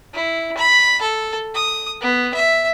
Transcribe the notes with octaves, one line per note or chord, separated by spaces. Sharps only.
E4
B5
A4
D#6
B3
E5